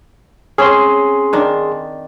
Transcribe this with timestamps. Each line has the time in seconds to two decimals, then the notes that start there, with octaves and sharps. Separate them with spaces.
0.58 C4 C#4 G#4 C6
1.33 D#3 D4